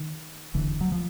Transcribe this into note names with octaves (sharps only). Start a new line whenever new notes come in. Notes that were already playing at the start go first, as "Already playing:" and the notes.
Already playing: D#3
E1 D2 D3 E3
F#3
F3